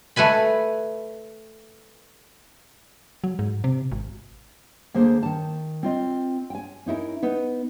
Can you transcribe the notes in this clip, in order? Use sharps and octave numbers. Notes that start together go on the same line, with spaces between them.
A3 B4 G#5 B5
F#3
G#2
C3
G#1
D2 A#3 G#4 A#4 C5
D#3 A5
C4 F4 D#5
G5 G#5
C#4 D#4 E4 A#4
B3 D#4 B4